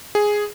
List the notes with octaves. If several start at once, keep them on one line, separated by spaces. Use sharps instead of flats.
G#4